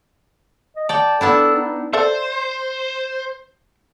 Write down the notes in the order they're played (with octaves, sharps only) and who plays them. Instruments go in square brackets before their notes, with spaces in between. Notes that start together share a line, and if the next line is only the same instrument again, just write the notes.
[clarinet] D#5
[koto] D5 G5 [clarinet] A5
[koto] B3 D4 E4 [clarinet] A4
[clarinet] D#4
[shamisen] A4 D5 E5 [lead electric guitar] C5